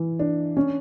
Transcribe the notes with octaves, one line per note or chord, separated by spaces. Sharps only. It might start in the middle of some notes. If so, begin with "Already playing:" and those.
Already playing: E3
D4
C#4